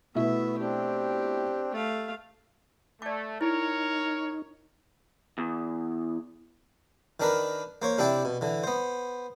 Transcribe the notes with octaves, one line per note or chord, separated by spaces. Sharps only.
B2 A3 B3 E4 E5
C4 D4 G4
A3 F5
A3 D5 D6
D#4 E4 A#4 C#5
E2
D#3 D4 A#4 B4
A#3 C5 C#5
C3 D4 E4 D5 G5
B2
D3 E3
B3 C5